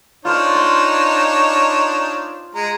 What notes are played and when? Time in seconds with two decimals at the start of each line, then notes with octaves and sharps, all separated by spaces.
0.25 D4 D#4 F4 C5 C#5
0.55 C6
2.55 G#3 A#5